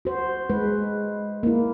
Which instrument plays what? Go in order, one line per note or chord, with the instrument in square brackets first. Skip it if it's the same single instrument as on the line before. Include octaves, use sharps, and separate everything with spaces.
[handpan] F#4 C5
G#3 B4
A#3 E4